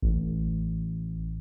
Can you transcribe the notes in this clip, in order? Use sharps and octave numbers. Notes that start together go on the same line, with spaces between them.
A1